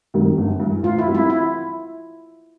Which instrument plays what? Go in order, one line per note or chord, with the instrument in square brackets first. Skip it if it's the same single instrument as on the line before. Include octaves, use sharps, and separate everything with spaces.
[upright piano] G2 D#3 G3 C4
G1
G2 E3
[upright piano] A2 [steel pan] F4
[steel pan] E4
[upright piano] E3 G3 C4
[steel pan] E4
E4